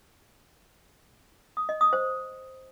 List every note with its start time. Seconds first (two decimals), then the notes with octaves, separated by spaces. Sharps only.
1.57 D#6
1.69 D#5
1.81 D#6
1.93 C5